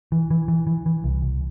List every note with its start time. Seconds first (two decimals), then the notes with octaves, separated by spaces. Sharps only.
0.12 E3
0.31 E3
0.48 E3
0.67 E3
0.86 E3
1.04 C2
1.22 C2